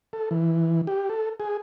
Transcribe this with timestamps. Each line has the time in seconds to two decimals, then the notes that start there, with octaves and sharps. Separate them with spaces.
0.13 A4
0.31 E3
0.87 G4
1.09 A4
1.40 G#4